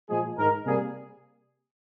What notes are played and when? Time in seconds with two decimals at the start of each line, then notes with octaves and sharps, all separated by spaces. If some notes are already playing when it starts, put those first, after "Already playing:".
0.09 A#2 F3 G#3 G#4
0.37 G#2 D#3 G#3 A#4
0.65 C3 G3 A#3 G#4